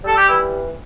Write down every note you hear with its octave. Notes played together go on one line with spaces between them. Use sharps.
G3 A4
G4
E3 E4